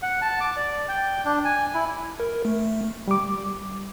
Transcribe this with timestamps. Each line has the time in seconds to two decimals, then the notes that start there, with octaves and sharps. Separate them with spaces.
0.03 F#5
0.22 A5
0.40 D6
0.57 D5
0.88 G5
1.25 D4
1.45 G#5
1.74 E4
2.20 A#4
2.45 A3
3.08 G3 D6